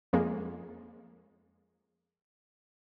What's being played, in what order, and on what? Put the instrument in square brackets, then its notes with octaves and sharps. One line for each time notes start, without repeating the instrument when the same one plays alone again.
[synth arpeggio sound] F2 G#3 A#3